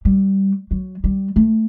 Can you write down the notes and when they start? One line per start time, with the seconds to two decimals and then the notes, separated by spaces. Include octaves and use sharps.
0.05 G3
0.71 F#3
1.04 G3
1.36 A3